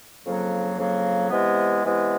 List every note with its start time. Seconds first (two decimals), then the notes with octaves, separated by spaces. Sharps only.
0.24 F2 C#3 F#3 A#3
0.77 F2 C#3 F#3 A#3
1.30 C3 E3 G#3 B3
1.85 C3 E3 G#3 B3